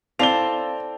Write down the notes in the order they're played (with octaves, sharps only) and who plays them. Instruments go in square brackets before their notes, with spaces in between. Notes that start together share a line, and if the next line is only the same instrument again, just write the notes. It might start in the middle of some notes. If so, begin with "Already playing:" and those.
[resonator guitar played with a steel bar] C4 [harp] E4 A4 D5 [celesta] F5 A5 [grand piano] F7 G7